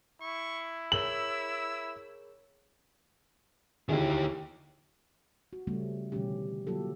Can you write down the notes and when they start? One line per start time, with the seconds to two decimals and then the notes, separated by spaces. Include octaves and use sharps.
0.22 E4 C#6
0.92 G#4 A#4 C#5 E6 F#7
3.89 D2 D#3 E4 G4 G#4
5.53 F#4
5.67 C#3 G3 A3 C4 C#4
6.12 B2 D3 E3 G3 C#4 G4
6.67 D3 F#3 A#3 F4 G4 A4